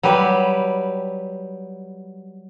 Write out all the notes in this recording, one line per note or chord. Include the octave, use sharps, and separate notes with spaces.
F#3 G3 G4 B4